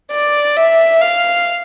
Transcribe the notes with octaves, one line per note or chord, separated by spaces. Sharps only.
D5
E5
F5